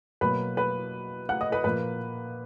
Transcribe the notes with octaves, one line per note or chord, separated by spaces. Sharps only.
B2 F#3 A#3 B4 B5
B4 B5
F#5 F#6
D#5 D#6
B4 B5
A#2 F3 A#3 B4 B5